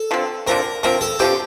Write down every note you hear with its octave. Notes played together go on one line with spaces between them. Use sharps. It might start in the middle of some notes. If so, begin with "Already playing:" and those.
Already playing: A4
D3 F3 C4
D3 F3 C4 A#4
D3 F3 C4 A#4
A4
D3 F3 C4 G4